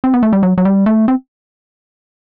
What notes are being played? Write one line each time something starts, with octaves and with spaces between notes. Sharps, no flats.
C4
B3
A3
G3
F#3
F#3
G3
A3
C4